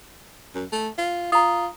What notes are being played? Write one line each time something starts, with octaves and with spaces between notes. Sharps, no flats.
F#2
A3
F4
F4 A#5 D#6